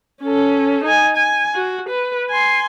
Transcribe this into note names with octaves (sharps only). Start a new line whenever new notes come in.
C#4 A4
D#4 G#5
G#5
F#4
B4
G#5 C6